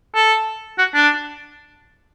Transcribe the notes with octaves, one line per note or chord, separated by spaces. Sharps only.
A4
F#4
D4